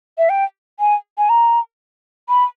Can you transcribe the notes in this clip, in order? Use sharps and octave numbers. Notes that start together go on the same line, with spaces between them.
E5
G5
G#5
G#5
A#5
B5